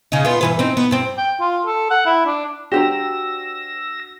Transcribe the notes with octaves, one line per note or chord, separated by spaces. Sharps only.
C#3 D#4
B3 F4
G2 E3 B4
C4 D#4
B3
G2 C4
G5
F4
A4
F#5
E4
D4
D4 F#4 G4 C5 A#5 E6 A#6